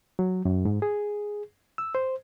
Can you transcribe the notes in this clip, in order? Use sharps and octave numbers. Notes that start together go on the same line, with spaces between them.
F#3
F#2
G#2
G#4
E6
C5